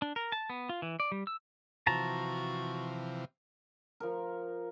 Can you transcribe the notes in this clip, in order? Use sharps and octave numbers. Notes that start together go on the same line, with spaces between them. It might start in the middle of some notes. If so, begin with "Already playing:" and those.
D4
A#4
A5
B3
F4
E3
D5
G3
E6
C3 E3 F3 F#4 A5 A#5
F3 A#4